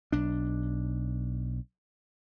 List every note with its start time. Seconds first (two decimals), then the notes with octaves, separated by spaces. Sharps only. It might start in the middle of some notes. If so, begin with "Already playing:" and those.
0.12 B1 D4